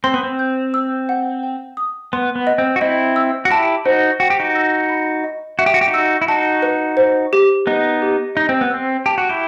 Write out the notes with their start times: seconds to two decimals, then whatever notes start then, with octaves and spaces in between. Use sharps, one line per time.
0.04 C4 C6
0.14 B3
0.23 C4
0.39 G6
0.74 E6
1.09 F#5
1.43 G5
1.77 D#6
2.13 B3 C6
2.35 B3
2.47 D#5
2.58 C4
2.76 F#4
2.81 C4 E4 D#5
3.16 E6
3.45 F#4
3.50 E4 G4 A5
3.85 D#4 F#4 C5
4.20 F#4 G5
4.30 G4
4.40 D#4 F#4
4.55 E6
4.89 B5
5.24 D#5
5.59 F#4 E5
5.66 G4
5.74 F#4
5.81 G4
5.88 D#4 F#4
5.94 E6
6.22 E4
6.28 D#4 F#4 A5
6.62 B4
6.97 C5
7.33 G4
7.67 B3 D#4 D#5
8.02 G4
8.35 D#4 D#5
8.49 C4
8.61 B3
8.70 C4 E6
9.06 G4 A5
9.18 F#4
9.29 E4 G4